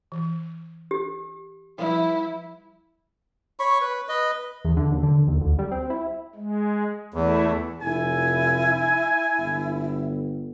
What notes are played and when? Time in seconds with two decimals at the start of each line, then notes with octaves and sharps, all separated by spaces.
0.12 E3
0.91 G4
1.78 F3 G3 E4 B4
3.60 C#5 B5 C#6
3.81 B4
4.09 B4 D#5
4.65 E2
4.77 D3
4.92 D#2
5.03 D3
5.28 D#2
5.41 D2
5.59 G3
5.71 C4
5.90 E4
6.35 G#3
7.14 E2 A3 E4
7.81 F1 E4 G#5
9.39 G1